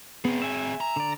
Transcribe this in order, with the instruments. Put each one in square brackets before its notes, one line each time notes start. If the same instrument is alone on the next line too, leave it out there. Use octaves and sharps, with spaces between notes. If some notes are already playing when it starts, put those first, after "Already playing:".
[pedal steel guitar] B3 [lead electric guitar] C4 G#4
[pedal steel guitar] E5 G#5
[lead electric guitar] A#5
[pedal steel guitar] D3 D5